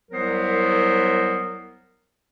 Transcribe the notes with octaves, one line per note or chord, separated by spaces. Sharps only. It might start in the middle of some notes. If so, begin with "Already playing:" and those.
C2 F#3 B3 A#4 C5